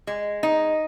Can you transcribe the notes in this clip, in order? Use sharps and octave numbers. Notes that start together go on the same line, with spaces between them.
G#3
D#4